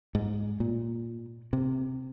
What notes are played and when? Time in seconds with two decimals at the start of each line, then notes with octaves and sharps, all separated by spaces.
0.15 G#2
0.60 A#2
1.53 C3